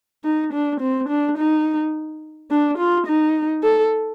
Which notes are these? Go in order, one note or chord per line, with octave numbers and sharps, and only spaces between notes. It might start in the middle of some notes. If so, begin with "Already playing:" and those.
D#4
D4
C4
D4
D#4
D4
F4
D#4
A4